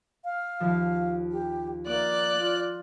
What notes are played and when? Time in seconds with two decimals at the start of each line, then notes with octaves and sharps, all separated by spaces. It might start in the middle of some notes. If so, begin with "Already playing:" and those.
0.24 F5
0.60 D#2 F3
1.31 G4
1.87 A#3 D5 D6 F#6
2.38 F4